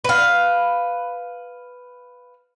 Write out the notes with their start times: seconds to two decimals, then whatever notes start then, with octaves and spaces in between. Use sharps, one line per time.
0.04 B4 F5